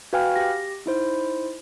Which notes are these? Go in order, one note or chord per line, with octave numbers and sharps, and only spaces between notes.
F#4 B4 F5 G5 G#5 F6
G4 A#6
D#4 E4 C5